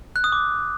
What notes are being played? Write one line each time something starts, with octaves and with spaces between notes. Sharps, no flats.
F#6
D#6
D6